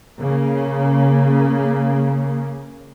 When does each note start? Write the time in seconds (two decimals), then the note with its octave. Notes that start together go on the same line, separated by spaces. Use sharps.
0.18 C#3 A#3